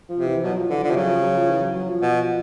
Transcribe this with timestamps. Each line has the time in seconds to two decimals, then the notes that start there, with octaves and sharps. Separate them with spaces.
0.09 F3
0.17 C3
0.26 E3
0.44 B2 F#3
0.57 F3
0.70 D3 E3
0.83 D3 F3
0.91 C3
0.96 C#3 F#3
1.09 F3
1.22 F#3
1.36 F3
1.50 E3
1.62 F#3
1.75 F#3
1.89 F3
2.01 B2